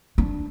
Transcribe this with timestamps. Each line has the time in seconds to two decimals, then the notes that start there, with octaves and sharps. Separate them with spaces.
0.18 D4